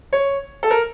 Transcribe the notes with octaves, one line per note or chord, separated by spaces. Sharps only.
C#5
A4
A#4